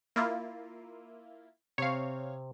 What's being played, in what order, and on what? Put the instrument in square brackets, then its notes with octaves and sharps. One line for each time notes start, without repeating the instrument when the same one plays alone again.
[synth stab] A#3 E4 F4
[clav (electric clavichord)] C3 C4 [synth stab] C#5 F5